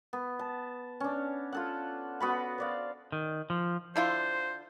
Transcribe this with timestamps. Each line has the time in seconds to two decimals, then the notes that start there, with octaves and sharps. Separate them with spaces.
0.13 B3
0.39 A5
1.00 C#4 D4
1.53 F4 A4 F#5
2.20 B3 F#4 B5
2.58 C5 D5 F5
3.12 D#3
3.50 F3
3.96 D3 E4 F4 C5